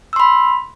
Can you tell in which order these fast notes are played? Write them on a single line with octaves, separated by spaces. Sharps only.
E6 C6 B5